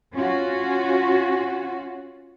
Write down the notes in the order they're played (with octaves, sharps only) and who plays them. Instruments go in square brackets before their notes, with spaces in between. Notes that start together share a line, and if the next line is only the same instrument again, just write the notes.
[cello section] C#4 F4 F#4